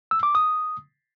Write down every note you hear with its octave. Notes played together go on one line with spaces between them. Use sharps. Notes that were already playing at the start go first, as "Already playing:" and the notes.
E6
D6
D#6